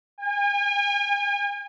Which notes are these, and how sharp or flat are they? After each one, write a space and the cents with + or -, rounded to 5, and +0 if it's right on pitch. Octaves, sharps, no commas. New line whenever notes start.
G#5 -40